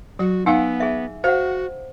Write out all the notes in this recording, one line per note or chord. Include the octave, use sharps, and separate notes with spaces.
F#3 F#4
B3 D#4 F5 F#5 G#5 E6
G#4 E5
F#4 C5 F5 F#5